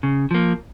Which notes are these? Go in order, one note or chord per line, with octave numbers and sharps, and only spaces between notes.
C#3
F3 A#3